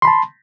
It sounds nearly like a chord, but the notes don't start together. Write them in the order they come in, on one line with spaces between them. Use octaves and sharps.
C6 B5 A5